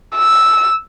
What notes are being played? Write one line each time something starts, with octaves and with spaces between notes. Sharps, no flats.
E6